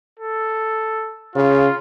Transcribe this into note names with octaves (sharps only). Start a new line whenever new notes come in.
A4
C#3 F4